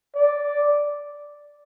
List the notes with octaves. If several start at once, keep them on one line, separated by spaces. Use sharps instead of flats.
D5